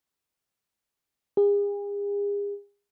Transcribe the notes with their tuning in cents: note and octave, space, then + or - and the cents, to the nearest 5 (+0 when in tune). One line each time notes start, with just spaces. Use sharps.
G#4 -40